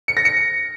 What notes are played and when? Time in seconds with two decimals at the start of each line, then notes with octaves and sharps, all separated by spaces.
0.08 C#7
0.17 A#6
0.25 C#7